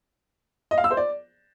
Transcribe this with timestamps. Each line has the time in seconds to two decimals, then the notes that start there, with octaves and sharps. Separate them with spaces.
0.71 D#5
0.78 F5
0.84 E6
0.91 C5
0.97 D5